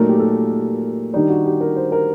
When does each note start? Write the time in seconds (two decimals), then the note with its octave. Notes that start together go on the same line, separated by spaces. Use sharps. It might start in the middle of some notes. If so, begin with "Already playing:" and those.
Already playing: A#2 F#3 A3 D#4 A#4
0.09 G4
0.20 A4
1.14 D#3 G3 D4 D#4
1.29 F#4
1.45 G4
1.61 A#4
1.76 C5
1.92 A#4